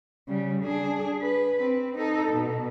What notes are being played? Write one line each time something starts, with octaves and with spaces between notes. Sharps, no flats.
C#3 G3
D4 G#4
B4
C4
D#4 A4
B2